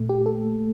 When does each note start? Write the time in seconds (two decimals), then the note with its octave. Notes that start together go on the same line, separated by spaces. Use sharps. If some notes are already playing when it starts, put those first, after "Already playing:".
Already playing: A#2 A3
0.09 G4
0.26 A4